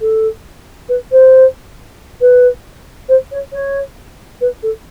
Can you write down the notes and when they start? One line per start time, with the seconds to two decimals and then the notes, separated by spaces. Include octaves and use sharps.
0.01 A4
0.89 B4
1.11 C5
2.21 B4
3.08 C5
3.31 C#5
3.52 C#5
4.41 B4
4.63 A4